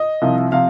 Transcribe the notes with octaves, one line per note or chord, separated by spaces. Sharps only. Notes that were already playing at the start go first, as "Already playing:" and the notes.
Already playing: D#5
C2 C3 F3
C3 F3 F5